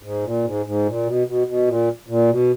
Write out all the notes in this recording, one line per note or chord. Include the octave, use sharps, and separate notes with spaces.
G#2
A#2
G#2
G#2
A#2
B2
B2
B2
A#2
A#2
B2